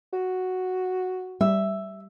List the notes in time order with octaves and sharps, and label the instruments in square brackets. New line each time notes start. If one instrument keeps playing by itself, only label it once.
[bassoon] F#4
[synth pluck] G3 [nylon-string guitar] E5